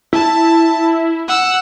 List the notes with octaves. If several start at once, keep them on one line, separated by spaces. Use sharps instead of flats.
E4 A5
F#5 E6